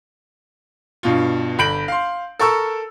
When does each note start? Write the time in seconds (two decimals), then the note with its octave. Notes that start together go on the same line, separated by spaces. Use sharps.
1.03 G2 B2 F4
1.59 G1 B5 G6 D7 F#7
1.88 F5 C6
2.39 A4 A#4 C#6 E6